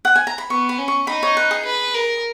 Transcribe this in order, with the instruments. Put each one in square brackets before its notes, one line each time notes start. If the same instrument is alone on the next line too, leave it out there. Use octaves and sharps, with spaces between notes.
[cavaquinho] F#5
G#5
A#5
B5
[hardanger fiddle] B3 [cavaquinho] C#6
[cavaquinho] B5
[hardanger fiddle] C#4
[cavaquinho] C#6
[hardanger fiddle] D#4 [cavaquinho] B5
[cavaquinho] C#5
B4
G#4
[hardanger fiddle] B4
A#4